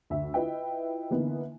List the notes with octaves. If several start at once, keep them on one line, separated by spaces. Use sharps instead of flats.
D2 E5
E4 F4 B4 D#5 E5 G5
D3 E3 A#3 B3 D#4